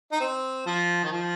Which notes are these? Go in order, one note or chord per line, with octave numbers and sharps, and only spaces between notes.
D#4
C4
F3
D#3
F3